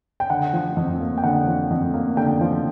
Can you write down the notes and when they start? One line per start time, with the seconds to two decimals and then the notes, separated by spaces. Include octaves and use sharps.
0.20 G5
0.30 D3 F#5
0.53 F3
0.77 F2
1.00 A#3
1.18 G5
1.24 D3 F#5
1.47 F3
1.70 F2
1.94 A#3
2.17 D3 G5
2.41 F3